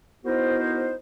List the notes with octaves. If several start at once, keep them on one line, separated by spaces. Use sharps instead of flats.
B3 D#4 E4 F#4 A#4 C5